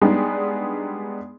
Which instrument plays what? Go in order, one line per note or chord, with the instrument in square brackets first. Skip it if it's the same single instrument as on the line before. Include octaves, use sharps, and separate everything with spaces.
[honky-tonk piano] G3 G#3 B3 D4 D#4 G#4